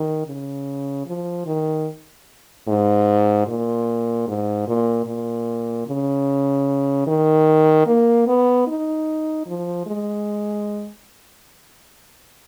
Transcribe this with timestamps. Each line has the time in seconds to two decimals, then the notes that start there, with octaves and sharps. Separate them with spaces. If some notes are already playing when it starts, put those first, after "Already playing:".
Already playing: D#3
0.26 C#3
1.06 F3
1.46 D#3
2.68 G#2
3.47 A#2
4.28 G#2
4.68 A#2
5.06 A#2
5.87 C#3
7.07 D#3
7.86 A#3
8.27 B3
8.67 D#4
9.47 F3
9.86 G#3